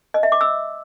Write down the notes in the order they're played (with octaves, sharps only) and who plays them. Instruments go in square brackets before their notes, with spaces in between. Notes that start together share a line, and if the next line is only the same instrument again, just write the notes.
[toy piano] D#5
E5
D6
E6